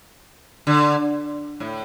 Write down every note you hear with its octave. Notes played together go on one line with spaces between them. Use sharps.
D3
A2